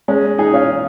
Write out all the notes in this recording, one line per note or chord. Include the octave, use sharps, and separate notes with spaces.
G#3 C#4
D#4 G#4
C#4 F4